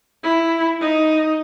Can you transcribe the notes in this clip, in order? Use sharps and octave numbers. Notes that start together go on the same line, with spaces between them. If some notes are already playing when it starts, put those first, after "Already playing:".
E4
D#4